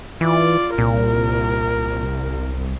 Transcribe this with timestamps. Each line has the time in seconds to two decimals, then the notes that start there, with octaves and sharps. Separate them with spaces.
0.21 E3 F4 D5
0.78 C2 A#2 A#4